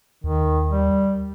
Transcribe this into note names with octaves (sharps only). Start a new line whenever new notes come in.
D#2 D#3
G3